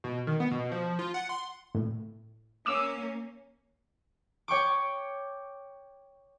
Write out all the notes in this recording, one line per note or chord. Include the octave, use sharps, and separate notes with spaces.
B2
D#3
B3
B2
F3
F4
F#5
C6
A2
A#3 C#4 D6 E6
C#5 G5 C#6 D6